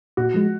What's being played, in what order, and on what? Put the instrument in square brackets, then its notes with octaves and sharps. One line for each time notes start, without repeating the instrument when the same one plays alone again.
[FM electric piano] A#2 [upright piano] F#4
[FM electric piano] F3 G#3